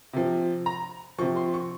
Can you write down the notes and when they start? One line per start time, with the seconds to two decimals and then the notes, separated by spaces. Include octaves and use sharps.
0.13 C3 F3
0.66 A#5
1.18 C3 F3 C#6
1.36 C6
1.54 C#6